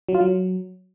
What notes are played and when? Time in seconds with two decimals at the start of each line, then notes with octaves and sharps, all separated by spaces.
0.09 F#3
0.15 F4
0.21 F#3